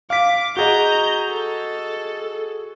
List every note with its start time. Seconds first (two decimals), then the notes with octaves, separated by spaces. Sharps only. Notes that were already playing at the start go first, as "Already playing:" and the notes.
0.10 F5 D6 B6
0.57 F#4 G#4 D#5 A#5 G6
1.29 A4